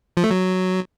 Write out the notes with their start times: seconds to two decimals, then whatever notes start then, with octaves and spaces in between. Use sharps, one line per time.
0.17 F3
0.24 A3
0.31 F#3